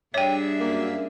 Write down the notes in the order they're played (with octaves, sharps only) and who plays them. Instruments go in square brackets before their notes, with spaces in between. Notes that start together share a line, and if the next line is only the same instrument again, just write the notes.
[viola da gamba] G2 D4 G#4 [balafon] C#5 G5 [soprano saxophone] E5
[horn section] F#2 A#3